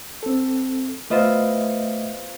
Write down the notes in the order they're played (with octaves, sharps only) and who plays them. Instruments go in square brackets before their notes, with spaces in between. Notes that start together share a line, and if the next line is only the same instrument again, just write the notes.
[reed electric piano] C4 A4
[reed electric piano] A3 D#5 E5 [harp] B3 F4 C5